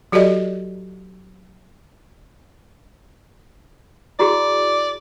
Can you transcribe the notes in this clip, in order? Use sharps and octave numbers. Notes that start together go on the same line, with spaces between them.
F#3 F#4 G4 A4 D5 D#5
E4 F#4 G#4 D5